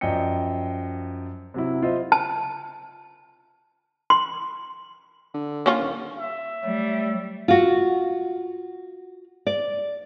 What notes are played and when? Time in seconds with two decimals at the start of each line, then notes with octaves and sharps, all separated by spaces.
0.01 F#2 F3 D5 D#5 G5 C#7
1.54 C3 F#3 E4
1.83 F4 C5 D#5 E5
2.12 A5
4.10 C6
5.34 D3
5.66 A#3 C#4 F4
5.80 D#1
6.18 E5
6.64 F#3 G3 A3
7.48 F4 F#4
9.47 D5